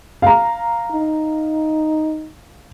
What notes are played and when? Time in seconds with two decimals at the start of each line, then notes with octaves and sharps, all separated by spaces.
0.22 F5 A#5
0.91 D#4